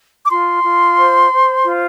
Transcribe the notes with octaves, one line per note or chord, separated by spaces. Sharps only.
D6
F4 C6
F4
C5
C5
F4